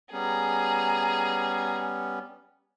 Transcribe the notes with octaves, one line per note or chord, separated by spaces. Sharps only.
G3 B3 C#4 G#4 A#5